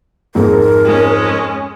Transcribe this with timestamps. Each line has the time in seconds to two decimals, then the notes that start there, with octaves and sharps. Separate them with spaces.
0.35 F2 G#2 A#4
0.85 G#3 C#4